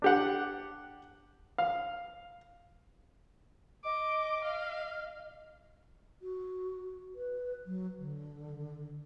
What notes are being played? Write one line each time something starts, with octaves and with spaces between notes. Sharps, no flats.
D4 G4 F#5
F5
D#5 D6
F5
F#4
B4
F#3
D3